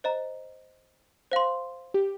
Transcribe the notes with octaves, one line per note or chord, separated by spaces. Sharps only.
C5 D#5 A#5
C5 F5 C6
G4